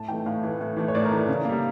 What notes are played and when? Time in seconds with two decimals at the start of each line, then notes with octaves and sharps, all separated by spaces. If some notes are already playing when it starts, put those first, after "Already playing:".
Already playing: A2 A5
0.08 E3 A3 G5
0.26 A2 F5
0.43 E3 A3
0.61 A2
0.76 E3 A3
0.88 C#5
0.95 A2 D5
1.05 A#4
1.11 E3 A3
1.17 A#4
1.28 C#3
1.45 G3 A#3